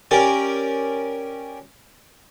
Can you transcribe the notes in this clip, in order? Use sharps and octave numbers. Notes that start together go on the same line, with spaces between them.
C#4 G4 A#4 D5